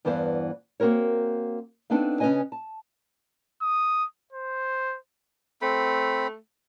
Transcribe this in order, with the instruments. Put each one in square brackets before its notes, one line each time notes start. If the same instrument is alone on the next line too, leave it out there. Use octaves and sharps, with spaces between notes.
[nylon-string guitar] E2 G2 E3 B3 C5 F5
A#3 C4 F#4 A#4 C#5
B3 C4 D4 D#4 A4 F5
C#3 C#4 G4 B4 D#5 G#5
A5
[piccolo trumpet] D#6
C5
[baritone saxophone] A3 [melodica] C4 B5